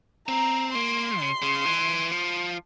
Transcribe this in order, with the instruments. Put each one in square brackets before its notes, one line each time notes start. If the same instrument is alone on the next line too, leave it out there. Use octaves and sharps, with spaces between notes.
[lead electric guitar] C4 [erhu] A#5
[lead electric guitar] A#3 [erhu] C6
[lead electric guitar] C#3
C#3
E3
F3